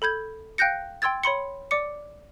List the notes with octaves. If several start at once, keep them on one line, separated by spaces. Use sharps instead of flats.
A4 B5 G6 G#6
F5 G5 F#6 G6 A#6 C#7
G5 C6 E6 G#6 A6
C#5 B5 C6 C#7
D5 D6 C#7